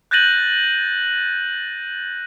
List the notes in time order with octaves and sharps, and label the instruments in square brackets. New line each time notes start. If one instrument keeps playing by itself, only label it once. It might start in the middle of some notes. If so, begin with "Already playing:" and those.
[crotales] F#6 G6 A6 A#6 D#7 F#7